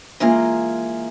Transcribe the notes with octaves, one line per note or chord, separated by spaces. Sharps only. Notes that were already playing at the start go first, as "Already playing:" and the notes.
E3 G#3 A#3 F4 G#4 A#5